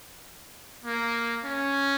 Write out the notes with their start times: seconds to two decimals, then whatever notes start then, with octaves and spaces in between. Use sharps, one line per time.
0.85 A#3
1.45 C#4